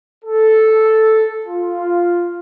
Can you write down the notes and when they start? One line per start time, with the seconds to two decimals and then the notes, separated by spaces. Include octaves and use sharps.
0.23 A4
1.45 F4